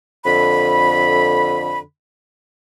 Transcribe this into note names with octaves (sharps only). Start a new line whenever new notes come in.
F2 D3 B5